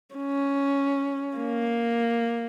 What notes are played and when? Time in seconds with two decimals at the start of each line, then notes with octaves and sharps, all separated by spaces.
0.15 C#4
1.37 A#3